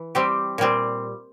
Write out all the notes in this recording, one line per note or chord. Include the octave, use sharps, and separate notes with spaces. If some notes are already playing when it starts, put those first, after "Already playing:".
Already playing: E3
G3 C4 G4
A#2 G3 C4